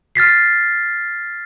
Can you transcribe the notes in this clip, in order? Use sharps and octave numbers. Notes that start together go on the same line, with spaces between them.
F6 A6 B6 C7